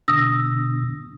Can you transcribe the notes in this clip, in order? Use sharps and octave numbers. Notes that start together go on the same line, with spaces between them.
B2 D3 D#6 E6 A#6